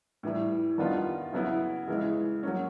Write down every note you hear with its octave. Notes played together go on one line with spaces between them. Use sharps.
A2 E3 G3
D#3 G3 B3 D4 F4
C#3 F#3 B3 E4
C#3 E3 G#3
F#3 A#3 C#4